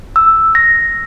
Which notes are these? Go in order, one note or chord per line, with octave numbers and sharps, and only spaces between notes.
E6
A#6